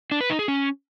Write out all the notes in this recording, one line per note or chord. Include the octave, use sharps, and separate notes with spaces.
D4
B4
D#4
G#4
C#4